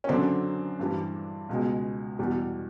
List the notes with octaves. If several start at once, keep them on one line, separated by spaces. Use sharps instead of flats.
C#4
F#2 D3 F#3 C4 D4
G2 E3 G3
C#2 B2 G#3
E2 B2 G3